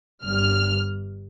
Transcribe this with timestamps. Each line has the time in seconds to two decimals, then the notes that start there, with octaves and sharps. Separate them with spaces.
0.24 G1 G2 G3 F6